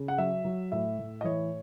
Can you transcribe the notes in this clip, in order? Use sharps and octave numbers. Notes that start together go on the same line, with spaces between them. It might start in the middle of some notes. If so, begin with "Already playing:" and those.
Already playing: C#3
F#5
F#3 E5
F#3
A2 E5
A2
D#5
E3 C#5